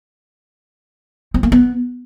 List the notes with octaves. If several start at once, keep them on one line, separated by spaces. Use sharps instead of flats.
C4
A#3
B3